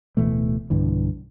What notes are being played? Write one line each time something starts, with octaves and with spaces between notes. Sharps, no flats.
D1 B2 E3 A3
B1 G2 D3 E3